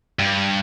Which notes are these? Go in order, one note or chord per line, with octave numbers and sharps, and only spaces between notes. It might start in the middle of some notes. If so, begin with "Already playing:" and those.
G2